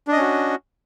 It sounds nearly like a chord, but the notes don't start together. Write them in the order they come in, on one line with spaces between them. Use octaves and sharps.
D4 D#5 C#4 F#4